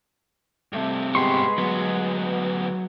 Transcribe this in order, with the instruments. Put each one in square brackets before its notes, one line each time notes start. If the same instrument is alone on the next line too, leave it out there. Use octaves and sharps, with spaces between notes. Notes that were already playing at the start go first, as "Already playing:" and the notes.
[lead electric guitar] G2 C3 [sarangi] A3
[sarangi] G#3 [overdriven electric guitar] B3 G4 [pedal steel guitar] B4 C6 C#6
[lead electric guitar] D2 B3 [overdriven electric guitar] F#3